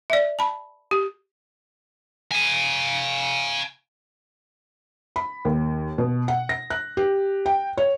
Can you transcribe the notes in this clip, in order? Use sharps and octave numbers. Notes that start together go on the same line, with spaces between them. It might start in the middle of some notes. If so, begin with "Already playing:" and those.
D5 E5
A5 B5
G4
F5 G#5
B5
D#2
B2
F#5
A#6
F#6
G4
G5
C#5